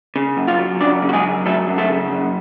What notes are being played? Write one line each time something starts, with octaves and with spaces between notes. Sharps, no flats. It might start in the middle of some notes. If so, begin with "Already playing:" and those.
C#3
F#2
F4 F5
F#3
F#2 D4 D5
C#3
F#4
G#3 G#4
F#2
F#3 A3 A4
F#2
A3 A4
C#3
F#2